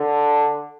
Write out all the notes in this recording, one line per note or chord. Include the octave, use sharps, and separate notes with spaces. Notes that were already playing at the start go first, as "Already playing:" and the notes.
Already playing: D3